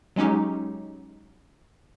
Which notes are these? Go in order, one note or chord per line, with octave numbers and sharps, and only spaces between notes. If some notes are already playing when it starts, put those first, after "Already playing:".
F#3 G#3 C#4 D#4 G4